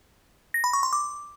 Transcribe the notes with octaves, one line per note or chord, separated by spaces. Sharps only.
A#6
B5
C#6
C6
D6